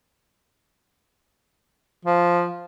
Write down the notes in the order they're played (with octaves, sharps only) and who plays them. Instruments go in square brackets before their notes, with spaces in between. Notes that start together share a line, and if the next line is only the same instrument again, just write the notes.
[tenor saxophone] F3